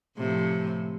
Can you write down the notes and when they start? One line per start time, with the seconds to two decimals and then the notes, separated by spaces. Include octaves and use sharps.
0.17 A2 C3 F3